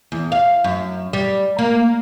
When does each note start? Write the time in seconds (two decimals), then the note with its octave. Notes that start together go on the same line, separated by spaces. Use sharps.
0.12 E2
0.32 F5
0.64 F#2
1.13 G3
1.59 A#3